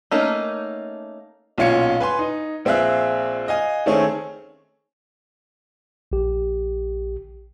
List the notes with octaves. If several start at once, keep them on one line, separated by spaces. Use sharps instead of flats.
A3 A#3 C#4 D#4
B1 A#2 C#4 F4 G#6 C#7
B4 G#5 C6
D#4
A#1 C4 G#4 E5 F5 F#6
D#5 F5 G#5
D#3 A3 C4 C#4 G#4
A#1 G4